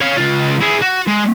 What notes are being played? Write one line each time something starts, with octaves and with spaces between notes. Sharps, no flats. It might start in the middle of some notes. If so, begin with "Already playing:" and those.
C#5 F5
C#2 F4
E4 G#4
F#4
G#3